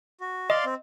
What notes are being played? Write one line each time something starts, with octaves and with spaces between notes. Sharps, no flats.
F#4
D5 D#5 F5 C6
C4